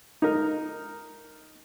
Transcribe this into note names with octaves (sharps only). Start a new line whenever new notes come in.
D#4 A#4